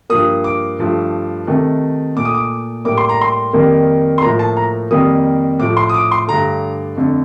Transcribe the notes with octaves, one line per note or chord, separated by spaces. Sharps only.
G2 F3 A#3 D#6
D6
G2 F3 A3
C3 D#3 A3
A#2 A3 D6
D#6
D6
A2 G3 A#3 D6
C6
A#5
C6
F2 D#3 G3 A#3
C6
A2 F3 A#3 A#5
A5
A#5
F2 D#3 G3 A#3 D#6
A2 F3 A3 D6
C6
D#6
D6
C6
G2 D3 A3 A#5
F2 D3 A3